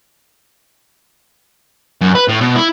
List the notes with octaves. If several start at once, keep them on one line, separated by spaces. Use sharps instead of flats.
F#2
B4
A2
B2
E4